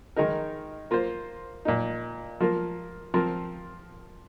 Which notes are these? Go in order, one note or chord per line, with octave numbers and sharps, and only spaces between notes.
D#3 G#3 D#4 A#4
A#3 F4 C5
A#2 A#3 D#4
F3 A#3 F4 A#4
F3 C4 F4 A#4